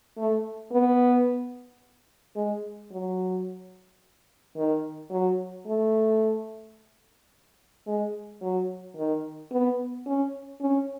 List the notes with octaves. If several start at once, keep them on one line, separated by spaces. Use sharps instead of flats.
A3
B3
G#3
F#3
D#3
F#3
A3
G#3
F#3
D#3
B3
C#4
C#4